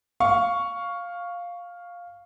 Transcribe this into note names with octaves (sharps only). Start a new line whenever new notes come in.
F5 C#6